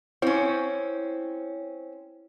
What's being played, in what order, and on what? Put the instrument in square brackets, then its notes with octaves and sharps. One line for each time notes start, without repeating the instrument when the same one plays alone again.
[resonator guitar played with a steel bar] C4 C#4 [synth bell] E4 C5 C#5